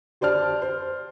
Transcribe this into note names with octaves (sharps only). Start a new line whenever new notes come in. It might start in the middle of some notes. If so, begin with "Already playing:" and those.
G4 C5 D5 A5 F6
C5